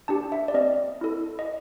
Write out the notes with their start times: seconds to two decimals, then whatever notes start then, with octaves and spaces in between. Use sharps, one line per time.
0.08 D4 G4 A5
0.32 E5
0.48 D5
0.54 C4 D#5
1.01 E4 A4
1.39 D#5